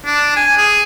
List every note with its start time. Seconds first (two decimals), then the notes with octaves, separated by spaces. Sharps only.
0.05 D4
0.36 G#5
0.58 G#4